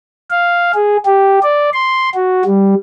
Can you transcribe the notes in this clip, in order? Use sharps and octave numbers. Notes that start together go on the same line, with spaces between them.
F5
G#4
G4
D5
C6
F#4
G3